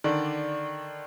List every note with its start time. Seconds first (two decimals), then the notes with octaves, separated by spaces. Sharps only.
0.04 D3 D#3 D5